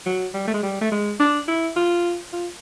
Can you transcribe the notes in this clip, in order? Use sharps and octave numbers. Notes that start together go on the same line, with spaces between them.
F#3
G3
A3
G#3
G3
A3
G#3
D4
E4
F4
F4